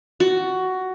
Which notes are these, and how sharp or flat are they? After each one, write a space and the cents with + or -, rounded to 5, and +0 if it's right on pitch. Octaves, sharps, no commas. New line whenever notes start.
F#4 +10